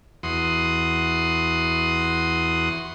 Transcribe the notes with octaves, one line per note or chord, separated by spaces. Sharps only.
E2 F#4 C6 D#6